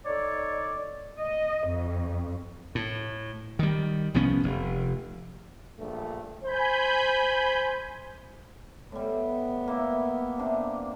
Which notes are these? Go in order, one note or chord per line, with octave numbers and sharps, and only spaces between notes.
D#4 A4 C#5 D5
D#5
F2
A2
D#3 G3
C2 F3 B3 C#4
F1
A#1 G2 A3
C5 G#5 B5 G6
A2 G3 B3
A#3 E4
C3 D4